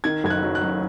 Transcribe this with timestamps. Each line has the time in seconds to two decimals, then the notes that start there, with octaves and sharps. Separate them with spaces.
0.04 D#3 G#6
0.24 F#1 G#6
0.30 F#6
0.43 F#3
0.55 F#6
0.62 F#2